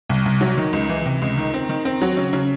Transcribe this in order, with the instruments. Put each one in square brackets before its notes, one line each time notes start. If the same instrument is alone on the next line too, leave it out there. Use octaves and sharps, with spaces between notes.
[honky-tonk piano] C2
C2
F#3
D#3
C#2
E3
C3
C#2
D#3
C4
D#3
C4
F#3
C#3
C#3